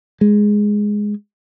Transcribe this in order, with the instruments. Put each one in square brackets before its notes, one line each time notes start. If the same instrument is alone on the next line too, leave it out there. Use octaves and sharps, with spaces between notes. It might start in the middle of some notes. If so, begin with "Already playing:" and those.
[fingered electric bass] G#3